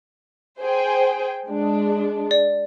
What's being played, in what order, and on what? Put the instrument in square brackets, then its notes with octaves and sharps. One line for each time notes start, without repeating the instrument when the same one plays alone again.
[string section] G#4 C5 G5
G#3 D4
[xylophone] D5